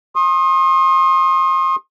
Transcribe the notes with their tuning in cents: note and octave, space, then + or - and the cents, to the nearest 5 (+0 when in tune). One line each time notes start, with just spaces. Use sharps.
C6 +35 D#6 -5